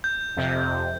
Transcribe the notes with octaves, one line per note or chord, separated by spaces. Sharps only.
G6
F2 C3